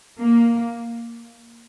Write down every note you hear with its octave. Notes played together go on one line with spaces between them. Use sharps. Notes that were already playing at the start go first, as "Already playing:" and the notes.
A#3